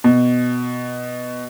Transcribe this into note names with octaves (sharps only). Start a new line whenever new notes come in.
B2